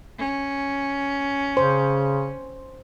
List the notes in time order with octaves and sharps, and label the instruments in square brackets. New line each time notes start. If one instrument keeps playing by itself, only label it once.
[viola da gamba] C#4
[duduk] C#3 [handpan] C5